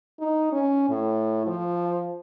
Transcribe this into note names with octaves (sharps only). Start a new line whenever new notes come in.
D#4
C#4
A2
F3